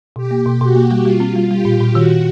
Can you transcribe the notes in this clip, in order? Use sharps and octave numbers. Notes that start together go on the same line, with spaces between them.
B2 G4
A#3
B2
B2 F#4
A#3
G3
G3 F4
C4
G3
G3 G4
A#2
A#2
D#3 F#4